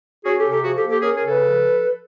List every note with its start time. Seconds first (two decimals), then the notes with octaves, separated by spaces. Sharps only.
0.25 C#4 F#4 G#4
0.37 G4 A4
0.44 C3
0.51 G4 A4
0.64 F3 F#4 G#4
0.76 G4 A4
0.83 A#3
0.89 G4 A4
1.02 C#4 G#4 A#4
1.14 G#4 A#4
1.21 C#3
1.27 A4 B4
1.40 F3